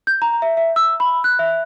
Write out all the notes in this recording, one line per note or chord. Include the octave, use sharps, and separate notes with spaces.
G6
A#5
E5
E5
E6
B5
F#6
E5